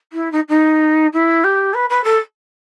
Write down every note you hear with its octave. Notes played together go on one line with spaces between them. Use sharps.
E4
D#4
D#4
E4
G4
B4
B4
A4